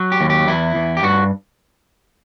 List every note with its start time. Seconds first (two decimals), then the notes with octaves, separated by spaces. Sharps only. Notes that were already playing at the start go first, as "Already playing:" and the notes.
Already playing: F#3
0.12 G4
0.21 D#2
0.30 G4
0.48 E2 E4
0.75 E2
0.97 G4
1.03 G2 F#4